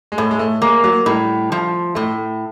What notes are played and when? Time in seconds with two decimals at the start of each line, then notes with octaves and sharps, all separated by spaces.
0.12 G#3
0.18 A2 A3
0.31 G#3
0.39 A3
0.62 G#3 A#3
0.84 F#3
1.06 A2 G3
1.52 F3
1.95 A2 A3